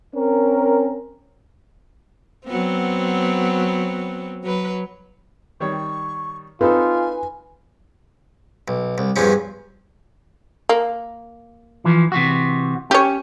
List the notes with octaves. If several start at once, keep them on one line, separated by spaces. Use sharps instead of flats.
C4 C#4 A#4
F#3 B3 C4
F#3 B4
D#3 G3 C#5 C#6
C4 D#4 F4 A4 B4 G#5
B1
C2
E2 G2 F3 C#4
A#3
E3 F3
C3 E3 F#4
C#4 G4 C#5